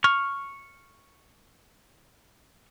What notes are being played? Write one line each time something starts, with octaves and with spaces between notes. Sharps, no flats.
C#6 F6